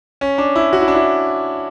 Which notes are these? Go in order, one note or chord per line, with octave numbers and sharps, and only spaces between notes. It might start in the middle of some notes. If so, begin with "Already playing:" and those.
C#4
D4
E4
F#4
E4
D4
E4